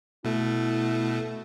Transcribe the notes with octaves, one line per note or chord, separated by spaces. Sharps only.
B2 A3 E4